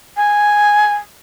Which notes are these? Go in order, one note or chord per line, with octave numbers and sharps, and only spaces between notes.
G#5